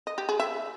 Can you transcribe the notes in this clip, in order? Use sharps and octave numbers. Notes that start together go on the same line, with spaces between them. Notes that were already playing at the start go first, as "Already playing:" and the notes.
D#5
G4
G#4
E5